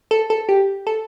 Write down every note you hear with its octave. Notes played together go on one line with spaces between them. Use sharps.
A4
A4
G4
A4